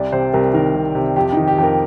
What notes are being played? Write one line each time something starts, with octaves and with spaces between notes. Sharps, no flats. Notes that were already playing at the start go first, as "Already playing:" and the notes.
Already playing: C2 D5
C3 C5
C2 A#4
D#3 A#4
C2
C3
F2 G4
D#3 D#4
G4
F2
A#4